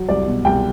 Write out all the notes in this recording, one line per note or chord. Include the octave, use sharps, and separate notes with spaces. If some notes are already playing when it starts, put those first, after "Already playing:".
Already playing: F#3
C2 D5
B2
C2 G5